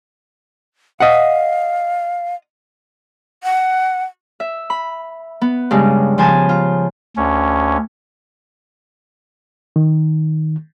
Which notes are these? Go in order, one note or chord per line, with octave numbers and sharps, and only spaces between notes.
D#5 F5 F#5
F#5
E5
B5
B3
G2 C#3 G#3
C#3 F3 C5 G#5 A5
F4
D2 C#4
D#3